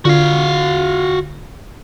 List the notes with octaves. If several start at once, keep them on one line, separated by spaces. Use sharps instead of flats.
D3 F4 F#4 F5